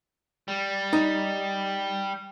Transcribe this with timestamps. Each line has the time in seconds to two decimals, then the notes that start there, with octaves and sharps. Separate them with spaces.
0.48 G3
0.93 D#4